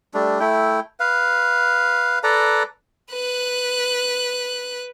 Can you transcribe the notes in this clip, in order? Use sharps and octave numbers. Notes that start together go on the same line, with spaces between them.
G3 A3 D4
A3 E4 G5
B4 F5
A4 B4 D5 A#5
B4 F#6